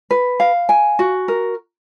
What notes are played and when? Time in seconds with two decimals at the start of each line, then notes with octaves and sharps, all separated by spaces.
0.11 B4
0.40 F5
0.69 G#5
0.99 F#4
1.28 A#4